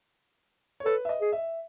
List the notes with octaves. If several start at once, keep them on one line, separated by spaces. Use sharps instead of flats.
C#5
A4 B4
E5
D#5
G#4
E5